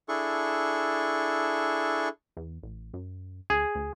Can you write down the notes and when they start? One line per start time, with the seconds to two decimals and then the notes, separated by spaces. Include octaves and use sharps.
0.09 D4 E4 G#4 A4 C#6
2.37 E2
2.63 A1
2.93 F#2
3.50 D2 G#4
3.75 D2